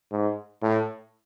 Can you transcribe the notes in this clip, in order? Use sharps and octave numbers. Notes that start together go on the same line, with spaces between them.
G#2
A2